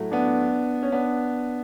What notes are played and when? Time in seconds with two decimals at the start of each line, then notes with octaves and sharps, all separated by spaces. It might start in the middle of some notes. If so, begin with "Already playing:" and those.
Already playing: A2 F#3 A3
0.12 B3 D4
0.83 C#4
0.92 B3 D4